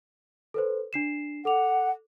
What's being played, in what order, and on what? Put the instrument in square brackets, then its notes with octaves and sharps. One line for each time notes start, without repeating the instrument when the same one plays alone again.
[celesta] A4 B4 C5
D4 C7 E7
[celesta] A4 D6 F7 [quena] F#5